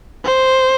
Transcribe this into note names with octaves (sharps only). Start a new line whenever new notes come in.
C5